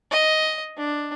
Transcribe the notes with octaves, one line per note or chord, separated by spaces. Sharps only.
D#5
D4